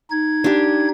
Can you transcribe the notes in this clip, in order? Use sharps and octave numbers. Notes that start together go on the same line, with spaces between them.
D#4 G#6
D4 G4